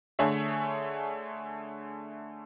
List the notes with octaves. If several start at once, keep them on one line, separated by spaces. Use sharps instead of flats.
D3 A3 G#4 C#5 E5